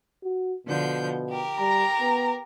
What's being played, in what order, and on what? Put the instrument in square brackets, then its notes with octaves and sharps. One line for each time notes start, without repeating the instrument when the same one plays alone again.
[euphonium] F#4
[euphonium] B2 [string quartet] D3 F3 G6
[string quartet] G4 A#4
[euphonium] G3 [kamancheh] A#5
[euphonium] B3